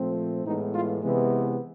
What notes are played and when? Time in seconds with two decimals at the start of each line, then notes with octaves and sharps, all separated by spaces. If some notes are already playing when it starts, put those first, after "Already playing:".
Already playing: A#2 F3 A3 C4
0.44 A2 E3 G#3 B3 D#4
0.72 F4
1.01 C3 E3 G#3 B3